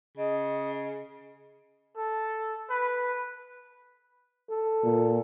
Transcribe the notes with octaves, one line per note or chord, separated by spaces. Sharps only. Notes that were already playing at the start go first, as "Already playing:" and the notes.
C#3 D#5
A4
B4
A4
A#2